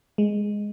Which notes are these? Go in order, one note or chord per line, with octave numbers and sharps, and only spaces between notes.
G#3